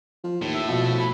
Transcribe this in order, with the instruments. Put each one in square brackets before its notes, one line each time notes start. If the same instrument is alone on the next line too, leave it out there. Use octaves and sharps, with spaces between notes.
[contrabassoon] F3
[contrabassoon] D#2 [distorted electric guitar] A2
[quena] E5
[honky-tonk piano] B2 [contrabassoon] F3
[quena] B5